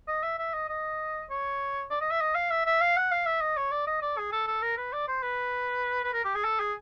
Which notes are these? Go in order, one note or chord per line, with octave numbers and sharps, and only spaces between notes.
D#5
E5
E5
D#5
D#5
C#5
D5
D#5
E5
D#5
F5
E5
E5
F5
F#5
F5
E5
D#5
C#5
D5
D#5
D5
G#4
A4
A4
A#4
B4
D5
C5
B4
B4
A#4
G4
G#4
A4
G#4